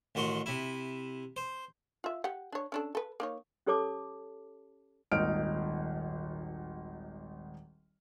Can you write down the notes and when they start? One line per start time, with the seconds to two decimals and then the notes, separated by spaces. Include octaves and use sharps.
0.15 A1 D#3 F#4 C6
0.46 C3 E4
1.36 C5
2.04 F4 E5
2.24 G4 F#5
2.52 D4 C#5
2.72 C#4 D4 A4
2.95 A4 B4
3.20 A#3 D#4 C#5
3.67 C#4 G4 A4 C#5 A5 D6
5.12 D#1 G#1 D#4 F6 D7